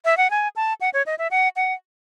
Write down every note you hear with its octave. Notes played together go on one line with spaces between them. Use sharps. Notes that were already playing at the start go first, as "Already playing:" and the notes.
E5
F#5
G#5
A5
F#5
C#5
D#5
E5
F#5
F#5